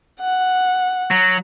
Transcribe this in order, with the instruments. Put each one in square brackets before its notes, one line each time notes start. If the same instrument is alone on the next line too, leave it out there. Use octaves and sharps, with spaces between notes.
[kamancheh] F#5
[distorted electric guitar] F#3